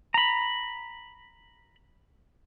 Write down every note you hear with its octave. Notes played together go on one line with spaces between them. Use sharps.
A#5 B5